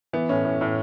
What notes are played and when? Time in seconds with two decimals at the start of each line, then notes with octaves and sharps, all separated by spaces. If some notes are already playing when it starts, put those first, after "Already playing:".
0.13 E3 B3
0.29 A2 C#4
0.45 A2
0.61 A2